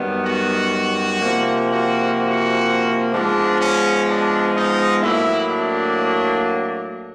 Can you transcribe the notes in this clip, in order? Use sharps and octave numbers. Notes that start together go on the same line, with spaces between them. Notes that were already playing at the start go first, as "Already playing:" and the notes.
Already playing: F#2 D#3 G3 B3
F#4
C3 F3 A#3
F#4
F#4
G#2 F3 G#3 B3 D4
C#4
D4
D#4
A2 F#3 A#3 E4
D4